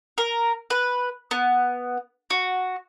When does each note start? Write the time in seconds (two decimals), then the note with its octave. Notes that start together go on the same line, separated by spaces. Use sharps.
0.18 A#4
0.70 B4
1.31 B3
2.30 F#4